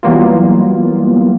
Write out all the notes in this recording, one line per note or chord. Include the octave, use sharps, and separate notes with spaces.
E3 F#3 G3 A#3 B3 F4